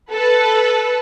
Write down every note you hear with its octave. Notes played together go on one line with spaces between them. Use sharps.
A4 B4